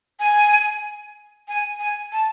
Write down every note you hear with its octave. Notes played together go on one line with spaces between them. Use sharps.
G#5
G#5
G#5
A5